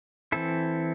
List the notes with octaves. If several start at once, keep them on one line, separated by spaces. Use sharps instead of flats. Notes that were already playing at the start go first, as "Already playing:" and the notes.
E3 C4 E4 A4